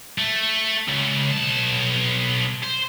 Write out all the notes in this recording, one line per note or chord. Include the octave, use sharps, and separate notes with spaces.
A3
C#2
B1 A5
C5